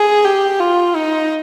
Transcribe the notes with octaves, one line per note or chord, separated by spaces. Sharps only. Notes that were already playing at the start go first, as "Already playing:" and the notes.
Already playing: G#4
G4
F4
D#4